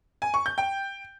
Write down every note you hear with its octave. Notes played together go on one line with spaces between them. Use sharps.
G#5
C#6
G6
G5